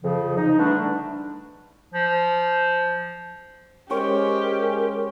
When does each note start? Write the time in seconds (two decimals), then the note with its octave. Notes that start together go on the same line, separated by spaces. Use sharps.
0.03 F2 C#3 F3
0.37 D#4
0.59 D3 E3 G3 A3 D4
1.94 F3
3.90 G#3 C#4 G4 A#4 C5 C#5 G5